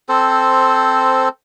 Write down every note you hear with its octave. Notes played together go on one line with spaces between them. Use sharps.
C4 A4 C5